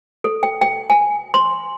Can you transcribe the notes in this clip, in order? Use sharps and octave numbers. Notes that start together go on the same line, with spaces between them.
A4
G5
G5
G#5
C6